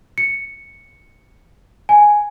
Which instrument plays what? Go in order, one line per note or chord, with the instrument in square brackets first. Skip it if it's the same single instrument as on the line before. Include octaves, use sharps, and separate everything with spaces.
[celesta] C#7
G#5